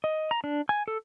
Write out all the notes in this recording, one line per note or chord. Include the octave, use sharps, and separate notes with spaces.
D#5
A#5
D4
G#5
A4